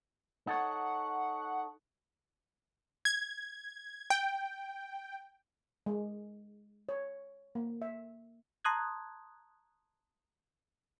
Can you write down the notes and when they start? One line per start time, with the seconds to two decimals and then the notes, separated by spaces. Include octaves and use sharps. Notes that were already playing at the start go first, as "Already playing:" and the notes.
0.47 D#4 A4 C#5 F#5
3.05 G#6
4.10 G5
5.86 G#3
6.89 C#5
7.55 A#3
7.82 E5
8.65 A5 A#5 C6 D#6 F#6 G#6